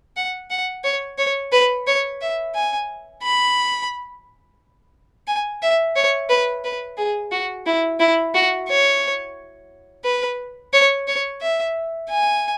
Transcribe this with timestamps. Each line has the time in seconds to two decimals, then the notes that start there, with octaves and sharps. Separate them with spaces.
0.16 F#5
0.50 F#5
0.84 C#5
1.18 C#5
1.52 B4
1.87 C#5
2.21 E5
2.55 G#5
3.23 B5
5.27 G#5
5.62 E5
5.96 C#5
6.29 B4
6.64 B4
6.98 G#4
7.32 F#4
7.66 E4
8.00 E4
8.34 F#4
8.69 C#5
10.04 B4
10.73 C#5
11.08 C#5
11.42 E5
12.09 G#5